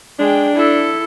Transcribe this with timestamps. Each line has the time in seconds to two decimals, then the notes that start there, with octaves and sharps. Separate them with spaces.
0.19 G#3 D4 G5
0.54 E4 A4